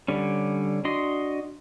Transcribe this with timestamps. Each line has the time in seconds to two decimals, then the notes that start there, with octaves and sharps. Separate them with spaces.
0.08 D3 G3 C#4
0.85 D4 F#4 D#5 C6